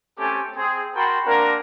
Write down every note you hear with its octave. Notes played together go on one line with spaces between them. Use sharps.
A3 C4 C#4 G4 A4 G#5
C4 G#4
F#4 A#4 G5 A5 B5 C6
A#3 C4 D4 F#4 A#4